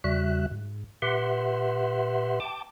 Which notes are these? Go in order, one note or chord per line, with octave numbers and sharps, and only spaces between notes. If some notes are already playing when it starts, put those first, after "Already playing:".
E2 C#3 G3 F#4 E5 F#6
G#2
A#2 G4 B4 E5 F#5 C6
G5 A5 D6